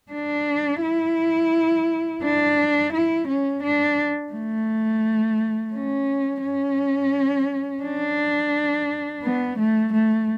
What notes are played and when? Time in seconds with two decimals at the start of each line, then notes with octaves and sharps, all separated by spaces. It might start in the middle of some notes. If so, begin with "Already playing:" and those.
0.12 D4
0.82 E4
2.23 D4
2.93 E4
3.27 C#4
3.63 D4
4.33 A3
5.74 C#4
6.43 C#4
7.83 D4
9.23 B3
9.59 A3
9.93 A3